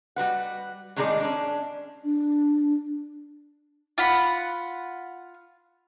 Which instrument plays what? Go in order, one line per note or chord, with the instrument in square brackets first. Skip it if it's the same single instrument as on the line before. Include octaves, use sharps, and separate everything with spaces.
[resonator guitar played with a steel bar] G3 F#4 B4 F#5
A2 D#3 G#3 D#4 G#4 D5
C#4 D4
[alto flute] D4
[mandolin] F4 F#5 B5